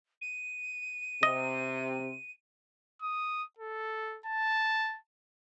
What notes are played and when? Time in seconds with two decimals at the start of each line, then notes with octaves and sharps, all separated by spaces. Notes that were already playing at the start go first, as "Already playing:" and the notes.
0.21 D#7
1.23 C3 D#5
3.02 D#6
3.58 A4
4.26 A5